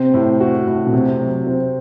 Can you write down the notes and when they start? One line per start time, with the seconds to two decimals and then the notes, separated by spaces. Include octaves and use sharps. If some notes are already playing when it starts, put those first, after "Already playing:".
Already playing: C3 C4
0.14 A2
0.40 F#4
0.67 A2
0.87 B2
0.93 C3 C4
1.20 F#3
1.47 C4